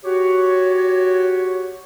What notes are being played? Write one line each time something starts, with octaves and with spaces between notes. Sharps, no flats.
F#4 G4 C#5